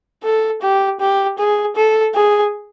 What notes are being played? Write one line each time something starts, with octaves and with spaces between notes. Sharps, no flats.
A4
G4
G4
G#4
A4
G#4